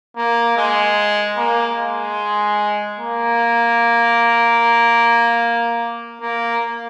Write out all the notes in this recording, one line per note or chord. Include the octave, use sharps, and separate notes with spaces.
A#3
G#3
A#3
G#3
A#3
A#3